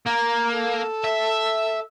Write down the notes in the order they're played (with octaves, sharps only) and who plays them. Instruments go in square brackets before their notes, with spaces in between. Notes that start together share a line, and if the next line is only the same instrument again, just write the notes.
[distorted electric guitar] A#3 [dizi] A#5
[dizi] A4
[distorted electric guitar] E5